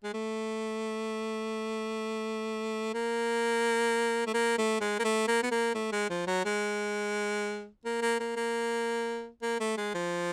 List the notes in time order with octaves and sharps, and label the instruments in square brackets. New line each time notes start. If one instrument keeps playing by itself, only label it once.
[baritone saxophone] G#3
A3
A#3
A3
A#3
A3
G#3
A#3
A3
A#3
B3
A#3
A3
G#3
F3
F#3
G#3
A#3
A#3
A#3
A#3
A#3
A3
G#3
F3